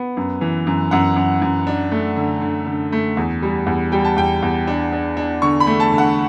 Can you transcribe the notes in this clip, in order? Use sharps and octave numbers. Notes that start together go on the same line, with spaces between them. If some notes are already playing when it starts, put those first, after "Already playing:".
Already playing: B3
F#2
E3
F#2
F#2 F#5
F#2
F#2
D4
A3
D3
D3
D3
A3
E2
G3
E2
G3 G5
A5
E2 G5
E2
D4
D4
D4
D3 C#6
B5
A3
A5
D3
F#5